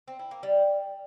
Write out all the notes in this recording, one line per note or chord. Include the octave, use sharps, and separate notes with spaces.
C4
E4
A#3
G3